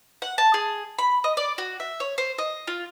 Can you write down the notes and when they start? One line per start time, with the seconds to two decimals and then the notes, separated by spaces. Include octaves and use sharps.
0.22 F#5
0.38 A5
0.54 G#4
0.99 B5
1.24 D#5
1.37 D5
1.58 F#4
1.80 E5
2.00 C#5
2.18 C5
2.38 D#5
2.67 F4